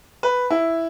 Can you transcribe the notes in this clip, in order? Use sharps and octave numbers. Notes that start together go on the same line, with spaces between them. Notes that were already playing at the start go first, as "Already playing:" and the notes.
B4
E4